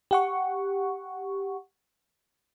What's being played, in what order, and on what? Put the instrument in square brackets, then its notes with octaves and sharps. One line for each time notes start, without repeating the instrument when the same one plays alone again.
[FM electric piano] G4 F#5 C#6